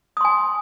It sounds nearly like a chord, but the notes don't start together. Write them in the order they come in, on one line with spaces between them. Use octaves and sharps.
D#6 C6 G#5